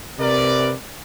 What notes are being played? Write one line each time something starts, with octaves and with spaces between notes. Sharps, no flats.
C3 A#4 B4 D5